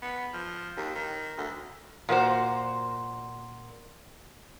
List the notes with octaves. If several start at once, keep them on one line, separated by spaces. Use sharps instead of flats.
B3
F3
D#2
D#3
D2
A#2 A#3 F#4 C5